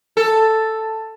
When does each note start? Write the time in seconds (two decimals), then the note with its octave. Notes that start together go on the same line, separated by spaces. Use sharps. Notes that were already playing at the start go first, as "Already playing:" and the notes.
0.17 A4